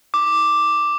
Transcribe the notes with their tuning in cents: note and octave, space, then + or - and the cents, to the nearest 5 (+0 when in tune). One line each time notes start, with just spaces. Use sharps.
D6 +0